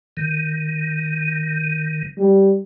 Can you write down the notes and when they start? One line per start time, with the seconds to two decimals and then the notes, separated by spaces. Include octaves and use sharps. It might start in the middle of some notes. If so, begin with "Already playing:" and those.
0.17 D#3
2.18 G3